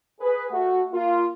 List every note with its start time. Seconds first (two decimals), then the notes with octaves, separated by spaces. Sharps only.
0.21 G#4 B4
0.50 A3 F#4
0.92 A#3 F4